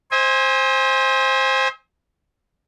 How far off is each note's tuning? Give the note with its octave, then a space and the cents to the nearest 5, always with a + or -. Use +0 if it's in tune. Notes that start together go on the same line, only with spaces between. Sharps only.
C5 +15 E5 -45 G#5 -20